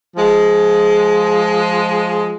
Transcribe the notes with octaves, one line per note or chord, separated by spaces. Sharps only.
F3 G#3